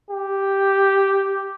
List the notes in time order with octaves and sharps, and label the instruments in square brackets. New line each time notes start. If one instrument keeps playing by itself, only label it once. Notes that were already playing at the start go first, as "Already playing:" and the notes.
[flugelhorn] G4